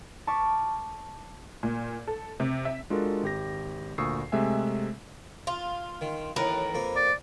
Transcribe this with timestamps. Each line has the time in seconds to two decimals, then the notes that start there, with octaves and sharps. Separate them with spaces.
0.27 A5 C#6 D6 F6 B6
1.63 A#2
2.07 A4
2.40 C3
2.65 E5
2.90 G#3 D4 F4 F#4 A4 A#4
3.23 G#1 G4 A#6
3.98 D2 A#2 C#6 D#6 E6 C7
4.32 C3 G#3 A3 E5 G#5
5.47 F4
6.01 D#3
6.36 A1 D#2 A2 A#4 B4
6.75 F2 A#3
6.96 D5